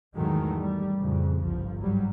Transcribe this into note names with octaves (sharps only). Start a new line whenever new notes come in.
E2 G#2 D#3 F#3 G#3 A3
G3
F2 A2 C#3
G1 C2 F3
G#2 F#3 G3